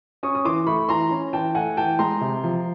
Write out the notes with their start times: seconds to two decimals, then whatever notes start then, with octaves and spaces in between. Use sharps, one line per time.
0.23 C#4 C#6 D#6
0.35 D#6
0.45 E3 C6 D6
0.67 A3 B5 C#6
0.89 E3 A#5 C6
1.11 C#4
1.33 E3 G5 A5
1.55 A3 F#5 G#5
1.77 E3 G5 A5
1.99 G#3 A#5 C6
2.21 C3
2.44 F3